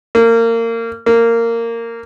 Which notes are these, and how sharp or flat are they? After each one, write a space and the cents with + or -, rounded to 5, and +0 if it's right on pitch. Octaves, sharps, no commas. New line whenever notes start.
A#3 -25
A#3 -15